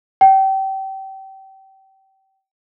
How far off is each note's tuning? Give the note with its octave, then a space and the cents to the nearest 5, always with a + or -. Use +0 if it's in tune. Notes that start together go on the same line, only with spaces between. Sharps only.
G5 -30